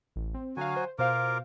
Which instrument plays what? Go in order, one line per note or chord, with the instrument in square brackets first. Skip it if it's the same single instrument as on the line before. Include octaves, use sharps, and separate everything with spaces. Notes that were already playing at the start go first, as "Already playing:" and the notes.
[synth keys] A1
C4
[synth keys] D3 F5 [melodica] F#3 F#4 G#5
[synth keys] C5
[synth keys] B2 C5 F5 [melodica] F4 A#4 D6